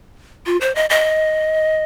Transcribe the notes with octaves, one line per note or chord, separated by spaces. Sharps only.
F4
C5
D#5
D#5